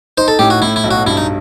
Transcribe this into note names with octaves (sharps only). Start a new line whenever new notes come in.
D#4 C5
A4
A2 G4
F#4
A2 E4
E4
B1
F#4
G2 E4
D#4